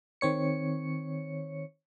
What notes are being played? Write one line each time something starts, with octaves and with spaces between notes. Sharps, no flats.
D#3 C4 C#5 C#7